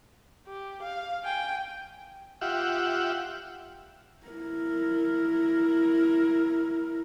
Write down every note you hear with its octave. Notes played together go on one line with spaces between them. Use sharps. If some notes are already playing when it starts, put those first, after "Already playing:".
G4
F5
G5 G#5
F4 G4 E5 F#5
E4 A#4